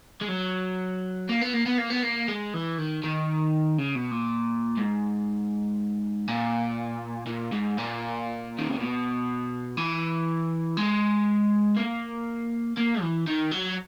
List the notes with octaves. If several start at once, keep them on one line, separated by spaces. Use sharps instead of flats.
G#3
F#3
A#3
B3
A#3
B3
A#3
B3
A#3
G#3
E3
D#3
D#3
C#3
B2
A#2
G#2
A#2
A#2
G#2
A#2
D#3
C#3
B2
E3
G#3
A#3
A#3
E3
D#3
F#3